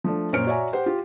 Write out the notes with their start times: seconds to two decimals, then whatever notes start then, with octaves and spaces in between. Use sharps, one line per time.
0.04 F3 A3 D4
0.33 F#2 A#2 C5 C#5 F6 D7
0.46 F#4 C#5 D5 E5 G#5 A#5
0.73 G4 C5 F#5 G5
0.86 F4 G4